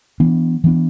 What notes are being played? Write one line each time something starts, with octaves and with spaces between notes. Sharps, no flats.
E3 B3 D4
E3 B3 D4